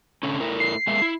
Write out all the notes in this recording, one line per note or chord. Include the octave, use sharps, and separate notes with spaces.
D3 A3 C#4
A3 E4 A#4
C7
G#3 A#3 E5
E4